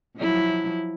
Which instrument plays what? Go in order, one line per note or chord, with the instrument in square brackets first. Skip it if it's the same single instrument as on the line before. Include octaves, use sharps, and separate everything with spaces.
[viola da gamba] F3 F#3 E4